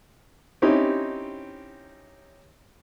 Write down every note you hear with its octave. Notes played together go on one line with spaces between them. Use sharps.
C4 C#4 D#4 E4 G4